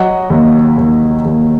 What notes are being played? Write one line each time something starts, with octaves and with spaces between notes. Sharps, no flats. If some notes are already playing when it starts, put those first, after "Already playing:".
Already playing: F#3 D#5 F#5
D#2
D#2
D#2